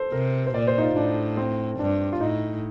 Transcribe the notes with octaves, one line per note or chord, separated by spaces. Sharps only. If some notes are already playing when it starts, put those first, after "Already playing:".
Already playing: A4 C5
C3 A#4
C5
A#2 D5
C5
D#4
F4
A2 D4
C4
G2 D4
F4
A2 D#4